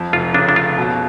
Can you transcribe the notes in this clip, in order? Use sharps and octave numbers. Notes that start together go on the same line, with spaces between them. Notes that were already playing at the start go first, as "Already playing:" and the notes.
Already playing: F2
F1 F4
C#3 D4
D4
C#3 F4
B2